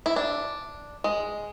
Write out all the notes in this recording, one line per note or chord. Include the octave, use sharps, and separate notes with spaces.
E4
D4
G#3